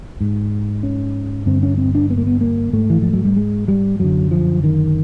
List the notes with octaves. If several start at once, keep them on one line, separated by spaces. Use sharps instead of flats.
G#2
C#4
G2 D3 C4
C#4
C4
D4
B3
A#3
B3
A#3
G#2 A3
E3
F3
F#3
G3
G#3
G3
F#2 D3 F#3
F3
D#3